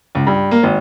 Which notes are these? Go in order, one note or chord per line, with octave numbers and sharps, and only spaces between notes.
C#2
G2
A#3
G#1